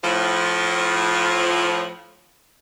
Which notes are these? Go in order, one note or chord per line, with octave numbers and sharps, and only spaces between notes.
A2 F3